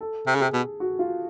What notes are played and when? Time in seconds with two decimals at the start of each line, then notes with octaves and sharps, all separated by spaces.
0.01 A4
0.27 C3
0.35 C#3
0.40 C3 G#4
0.53 B2
0.80 F#4
0.99 F4